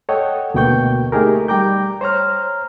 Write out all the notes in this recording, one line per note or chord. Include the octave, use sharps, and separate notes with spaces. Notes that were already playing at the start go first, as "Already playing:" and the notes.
A4 C#5 D#5 F#5 G5
D2 B2 A#3 G5 C#6 G6
A3 D#4 G4 G#4 A#4
G3 G5 A#5 D6 G6
C5 C#5 A#5 F6